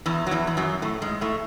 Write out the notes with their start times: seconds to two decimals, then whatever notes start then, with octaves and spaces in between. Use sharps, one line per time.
0.06 E2 E3
0.27 F#3
0.31 E2 E3
0.47 E3
0.57 F#2 F#3
0.82 A2 A3
1.02 G#2 G#3
1.21 A2 A3